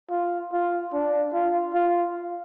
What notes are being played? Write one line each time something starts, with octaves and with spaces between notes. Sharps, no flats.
F4
F4
D4
F4
F4